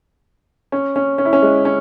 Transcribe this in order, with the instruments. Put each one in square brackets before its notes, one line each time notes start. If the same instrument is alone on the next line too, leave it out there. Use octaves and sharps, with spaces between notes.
[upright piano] C#4
C#4
C#4
E4
C#4
G#3
C#4